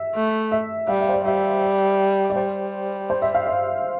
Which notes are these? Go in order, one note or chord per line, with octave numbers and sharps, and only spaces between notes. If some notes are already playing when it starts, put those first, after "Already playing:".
Already playing: E5
A3
E5
G3 F5
E5
C5
D5
G3 E5
D5
G3 C5
C5
E5
F5
E5